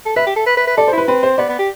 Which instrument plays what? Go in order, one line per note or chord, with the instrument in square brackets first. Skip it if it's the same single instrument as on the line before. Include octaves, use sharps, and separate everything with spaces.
[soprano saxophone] A4
[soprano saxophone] B4 [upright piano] E5
[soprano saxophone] G4
A4
B4
B4
B4
[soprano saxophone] A4 [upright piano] D5
[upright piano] C5
[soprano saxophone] E4
[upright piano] B4
[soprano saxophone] C4 [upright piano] B4
[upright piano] C5
[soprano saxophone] B3 [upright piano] D5
[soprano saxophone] B3
G4